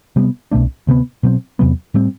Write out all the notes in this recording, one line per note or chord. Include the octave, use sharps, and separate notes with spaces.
C3 G3 B3
C2 B2 A3 D4
D2 C3 F#3 B3
B2 F#3 C4
E2 C3 F#3 B3
A2 G3 C4